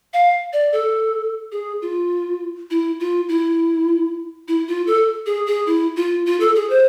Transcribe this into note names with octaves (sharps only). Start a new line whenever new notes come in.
F5
D5
A4
G#4
F4
E4
F4
E4
E4
F4
A4
G#4
G#4
E4
F4
F4
A4
G#4
C5